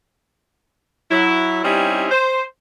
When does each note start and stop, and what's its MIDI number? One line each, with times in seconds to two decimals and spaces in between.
1.11 1.62 54
1.11 1.62 64
1.64 2.07 55
1.64 2.07 60
1.64 2.07 61
1.64 2.07 63
1.64 2.07 64
1.64 2.07 67
2.11 2.43 72